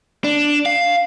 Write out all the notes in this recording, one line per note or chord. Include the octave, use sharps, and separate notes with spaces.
D4
F5